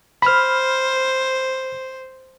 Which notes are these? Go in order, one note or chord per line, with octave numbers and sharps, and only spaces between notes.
C5 B5 F6